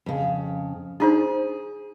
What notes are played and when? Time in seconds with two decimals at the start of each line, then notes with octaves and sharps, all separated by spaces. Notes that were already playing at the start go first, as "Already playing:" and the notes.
0.06 F2 C#3
1.00 D4 D#4 G#4 C5